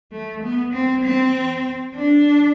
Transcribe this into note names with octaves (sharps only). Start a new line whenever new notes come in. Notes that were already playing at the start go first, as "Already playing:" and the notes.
A3
B3
C4
C4
D4